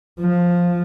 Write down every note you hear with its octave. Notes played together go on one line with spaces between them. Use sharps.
F3